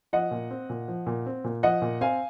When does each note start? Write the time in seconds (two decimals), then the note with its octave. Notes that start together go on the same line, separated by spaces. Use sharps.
0.13 F3 D#5 F#5
0.31 A#2
0.51 C4
0.70 A#2
0.88 F3
1.07 A#2
1.26 C4
1.44 A#2
1.63 F3 D#5 F#5
1.82 A#2
2.01 C4 F5 G#5